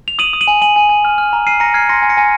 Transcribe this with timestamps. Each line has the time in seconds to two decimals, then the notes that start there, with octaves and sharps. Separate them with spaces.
0.08 F7
0.19 D#6 D#7 F#7
0.33 D#6
0.41 D#7 F#7
0.48 G#5
0.62 G#5 D#7 F#7
0.76 G#5
0.89 G#5
1.05 F6
1.18 F6
1.33 A#5
1.47 F6 C7 D#7
1.60 A#5 A#6 C#7
1.74 F6 G#6 C7
1.89 C6 A#6 C#7
2.02 G#5
2.09 A#6 C#7
2.17 G#5